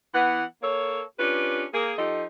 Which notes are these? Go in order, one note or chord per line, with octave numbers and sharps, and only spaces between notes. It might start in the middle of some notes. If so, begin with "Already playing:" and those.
E3 B3 F#5
A#3 A4 C#5
C#4 D4 F4 G4 B4
A#3 G#4
F3 D#4 G4 A4 D#5